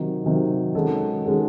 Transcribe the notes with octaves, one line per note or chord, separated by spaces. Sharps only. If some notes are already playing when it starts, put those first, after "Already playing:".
Already playing: C3 D#3 F#3
C3 D#3 F#3
D#3 G#3 C#4 F#4 A4
D#3 G#3 C#4 F#4 A4